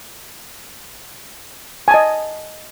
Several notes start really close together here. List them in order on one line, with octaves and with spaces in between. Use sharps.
G#5 A5 D#5